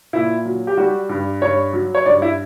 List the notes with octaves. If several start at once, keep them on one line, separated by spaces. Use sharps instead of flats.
A#2 E4
F#3
G4
G3 F#4
G2
G2 C#5
F#3
C#5
G2 D5
E4